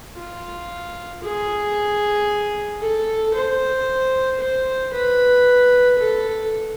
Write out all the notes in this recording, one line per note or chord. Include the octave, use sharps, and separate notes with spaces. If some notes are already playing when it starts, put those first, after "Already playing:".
F4
G#4
A4
C5
C5
B4
A4